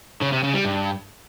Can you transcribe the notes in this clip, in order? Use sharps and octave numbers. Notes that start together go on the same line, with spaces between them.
C#3
C3
C#3
G3
G2